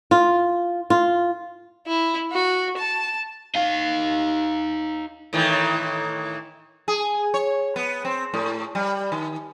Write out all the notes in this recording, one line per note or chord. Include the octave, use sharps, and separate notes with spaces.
F4
F4
E4
F#4
A5
D#4 F5
A2 D#3 E3
G#4
C#5
B3
C4
A2
G3
D#3